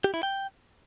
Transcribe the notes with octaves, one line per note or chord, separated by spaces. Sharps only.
G4
E4
G5